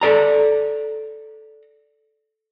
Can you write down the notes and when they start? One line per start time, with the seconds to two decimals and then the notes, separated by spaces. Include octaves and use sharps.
0.01 A4 D5 A#5